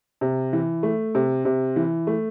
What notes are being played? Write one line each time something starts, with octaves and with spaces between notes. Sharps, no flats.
C3
E3
A3
C3
C3
E3
A3